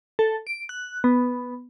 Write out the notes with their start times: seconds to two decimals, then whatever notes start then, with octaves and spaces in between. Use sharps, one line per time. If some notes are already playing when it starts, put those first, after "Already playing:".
0.19 A4
0.47 D7
0.69 F#6
1.04 B3